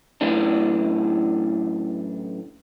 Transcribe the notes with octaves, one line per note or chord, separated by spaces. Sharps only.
F#2 A2 E3 D4